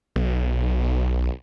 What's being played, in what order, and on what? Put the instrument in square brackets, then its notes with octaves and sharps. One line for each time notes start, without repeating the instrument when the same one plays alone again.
[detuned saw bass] B1